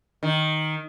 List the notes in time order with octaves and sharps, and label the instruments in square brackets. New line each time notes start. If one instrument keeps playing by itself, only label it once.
[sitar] D#3